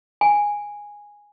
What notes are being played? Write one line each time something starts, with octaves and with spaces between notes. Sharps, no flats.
G#5